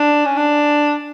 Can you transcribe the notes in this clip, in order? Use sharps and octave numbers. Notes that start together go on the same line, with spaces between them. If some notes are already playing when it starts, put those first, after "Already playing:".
Already playing: D4
C#4
D4